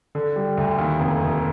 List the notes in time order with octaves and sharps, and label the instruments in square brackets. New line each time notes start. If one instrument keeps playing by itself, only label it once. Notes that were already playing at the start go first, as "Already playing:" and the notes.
[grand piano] D3
G3
D2
D#2
F1
F1